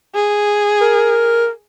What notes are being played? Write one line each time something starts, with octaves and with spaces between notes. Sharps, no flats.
G#4
A#4